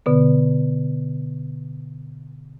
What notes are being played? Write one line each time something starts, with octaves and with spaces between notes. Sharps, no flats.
B2 D3 B3